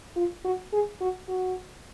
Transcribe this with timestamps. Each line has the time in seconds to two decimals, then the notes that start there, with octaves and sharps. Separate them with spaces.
0.16 F4
0.45 F#4
0.73 G#4
1.01 F#4
1.29 F#4